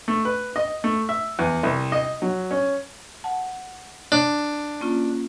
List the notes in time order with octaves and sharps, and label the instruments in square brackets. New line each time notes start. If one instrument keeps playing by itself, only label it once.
[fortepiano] A3
B4
D#5
A3
E5
E2
C2
D#5
F#3
C#4
[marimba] F#5 A5
[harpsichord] D4
[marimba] A#3 C#4 F4